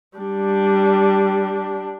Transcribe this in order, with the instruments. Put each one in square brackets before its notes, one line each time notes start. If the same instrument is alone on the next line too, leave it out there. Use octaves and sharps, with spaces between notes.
[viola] G3 D4